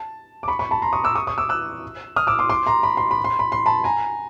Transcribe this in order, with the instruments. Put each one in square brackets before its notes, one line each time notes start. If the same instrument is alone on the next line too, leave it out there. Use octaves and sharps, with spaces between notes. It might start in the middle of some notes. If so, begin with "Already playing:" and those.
Already playing: [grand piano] A5
D6
B5 C#6
B5 C#6
A5 B5
A#5 C6
C#6 D#6
D6 E6
C#6 D#6
C#6 D#6
D6 E6
E6 F#6
D#6 F6
D6 E6
C6 D6
C6 D6
A#5 C6
B5
C6
B5
C6
B5
C6
A5 B5
G#5 A#5